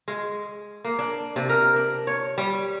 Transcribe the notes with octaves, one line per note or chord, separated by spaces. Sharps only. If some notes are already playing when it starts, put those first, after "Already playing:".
G#3
A#3
D4
C3
A#4
D4
C#5
G3